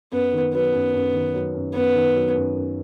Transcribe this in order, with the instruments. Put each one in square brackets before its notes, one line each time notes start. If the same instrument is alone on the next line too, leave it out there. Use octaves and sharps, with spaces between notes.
[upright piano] F#2 [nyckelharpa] B3
[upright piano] D#3
[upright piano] F#3 [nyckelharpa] B3
[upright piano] F#2
F#2
D#3
F#3
F#2
[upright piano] F#2 [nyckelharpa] B3
[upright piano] D#3
F#3
F#2
F#2